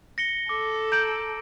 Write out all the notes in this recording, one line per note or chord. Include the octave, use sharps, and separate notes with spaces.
A#6 C#7 G7
A4 D6
A#5 G6 D7 F#7